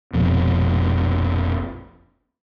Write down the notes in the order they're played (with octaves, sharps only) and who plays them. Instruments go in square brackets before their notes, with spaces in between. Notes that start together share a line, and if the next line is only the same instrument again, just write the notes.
[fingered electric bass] F1 A#1 F2 B2